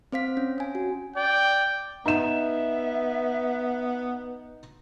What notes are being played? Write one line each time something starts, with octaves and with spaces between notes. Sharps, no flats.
C4 C5 F5 B6
C#4
C#4 G#5
F#4
D5 G5
B3 D#4 E5 E7